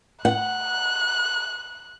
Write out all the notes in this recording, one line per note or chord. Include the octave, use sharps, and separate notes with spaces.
F#5 F#6